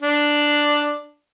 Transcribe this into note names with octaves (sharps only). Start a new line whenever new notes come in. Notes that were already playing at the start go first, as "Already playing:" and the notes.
D4